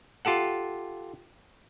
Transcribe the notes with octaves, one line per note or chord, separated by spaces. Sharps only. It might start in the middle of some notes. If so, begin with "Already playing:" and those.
F4 G4 A4 F#5